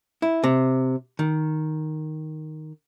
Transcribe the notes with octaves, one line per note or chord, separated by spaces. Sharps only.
E4
C3
D#3